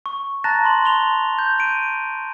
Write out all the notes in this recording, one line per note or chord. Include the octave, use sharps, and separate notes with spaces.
C#6
A5 A#5 F#6 A6 A#6
B5 C6 F#7
A5 C6 F7 G7
G6
G6 D7 D#7